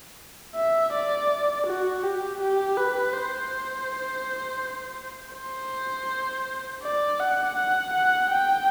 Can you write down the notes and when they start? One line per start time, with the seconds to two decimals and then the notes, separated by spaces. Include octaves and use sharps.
0.56 E5
0.92 D5
1.66 F#4
2.03 G4
2.40 G4
2.77 B4
3.14 C5
5.35 C5
6.83 D5
7.19 F#5
7.56 F#5
7.93 F#5
8.30 G5